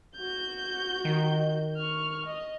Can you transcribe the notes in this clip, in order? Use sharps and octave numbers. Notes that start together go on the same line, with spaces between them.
F#4 G6
D#3
C#6 F6
D#5